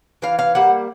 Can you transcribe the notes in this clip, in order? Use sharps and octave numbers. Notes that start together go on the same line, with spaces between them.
E3 F5
F5
G3 A#3 F#5